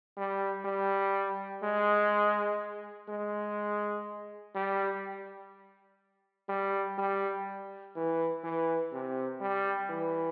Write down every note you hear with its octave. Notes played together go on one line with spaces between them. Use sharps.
G3
G3
G#3
G#3
G3
G3
G3
E3
E3
C3
G3
E3